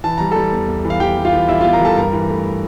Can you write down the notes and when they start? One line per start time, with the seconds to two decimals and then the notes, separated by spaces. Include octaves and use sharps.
0.04 E3 A5
0.18 G3 A#5
0.31 G3 A4 A5
0.52 E2
0.68 E2
0.85 E3
0.90 F5
1.00 E3 G4 G5
1.17 G3
1.25 F4 F5
1.33 E3
1.48 G3 E4 E5
1.61 F4 F5
1.65 E2
1.73 A#4 A#5
1.81 G3 A4 A5
1.97 G2 A#4 A#5
2.13 E3
2.29 A3